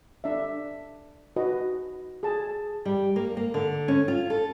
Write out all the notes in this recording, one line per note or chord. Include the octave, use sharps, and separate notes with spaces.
D4 E5
D#4 F#4 B4 D#5
G#4 A5
G3
A#3
A#3
D3
C#4
F4
A4